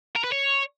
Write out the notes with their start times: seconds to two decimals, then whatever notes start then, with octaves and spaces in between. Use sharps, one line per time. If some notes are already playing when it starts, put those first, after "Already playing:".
0.16 A#4
0.24 B4
0.32 C#5